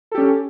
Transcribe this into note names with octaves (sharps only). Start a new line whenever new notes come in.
C#4 G4 A4